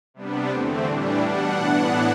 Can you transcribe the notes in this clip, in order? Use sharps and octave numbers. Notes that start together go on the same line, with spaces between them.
C3 G3 B3 D4
E2 D3 A3 C4
A2 E3 G3 D4
B2 G3 D4 F#5
A2 E3 B3 D4